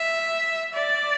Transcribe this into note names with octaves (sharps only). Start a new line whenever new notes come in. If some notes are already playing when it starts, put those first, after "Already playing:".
Already playing: E5
D5